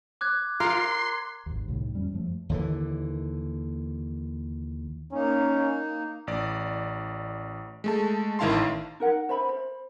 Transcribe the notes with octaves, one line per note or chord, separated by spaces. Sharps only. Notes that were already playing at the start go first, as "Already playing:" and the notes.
D6 F#6 G#6
F4 A#4 C6
C6
G#1 D#2
C2 A2 D#3
F2 G3 C#4
F#2 F3 A3
D#2 D3 E3
A#3 C#4 D#4
A1 D5
G#3 A3 A5
A1 D#3 E4 F5 A5 C6
D#4 A#4 F#5
C5 E5 B5
C5